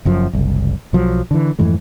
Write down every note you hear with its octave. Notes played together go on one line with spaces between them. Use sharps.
F#1 F#2 F3
F#1 C2
B1 F3 F#3
D3 E3
F2 G#2 E3 A3